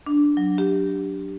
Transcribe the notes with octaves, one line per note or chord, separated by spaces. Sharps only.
D4
F#3
G4